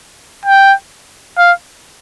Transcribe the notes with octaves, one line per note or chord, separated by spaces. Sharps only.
G5
F5